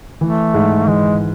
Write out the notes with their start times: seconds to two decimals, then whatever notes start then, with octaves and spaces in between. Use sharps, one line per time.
0.21 E3 A3
0.54 G#2
0.87 E3 G#3